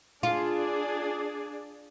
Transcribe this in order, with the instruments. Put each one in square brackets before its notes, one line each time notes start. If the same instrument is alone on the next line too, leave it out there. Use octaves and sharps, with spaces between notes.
[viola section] D4 G#4 D5 [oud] F4